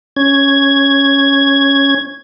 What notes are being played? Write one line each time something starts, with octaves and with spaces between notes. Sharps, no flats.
C#4 G#6